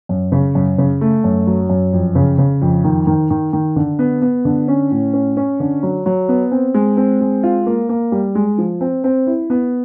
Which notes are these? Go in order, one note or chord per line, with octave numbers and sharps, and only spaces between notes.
F#2
C#3
F#2
C#3
A3
F#2
F#3
F#2
F2
C#3
C#3
F2
D#3
D#3
D#3
D#3
D3
B3
B3
D3
C#4
A2
C#4
C#4
D3
F#3
F#3
B3
C4
G#3
C4
G#3
F4
A#3
A#3
G3
G#3
F3
C4
C4
E4
B3